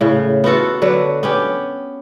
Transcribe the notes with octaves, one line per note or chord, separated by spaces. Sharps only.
A2 C#3
B3 F4 F#4 A4
D3 F#3 B4
B3 C#4 G4